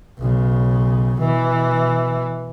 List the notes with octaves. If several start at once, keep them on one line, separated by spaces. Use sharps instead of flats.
B1 C#3
B2 E3